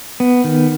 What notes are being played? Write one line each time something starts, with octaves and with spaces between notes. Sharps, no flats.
B3
D#3